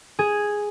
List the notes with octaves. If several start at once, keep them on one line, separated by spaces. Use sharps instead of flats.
G#4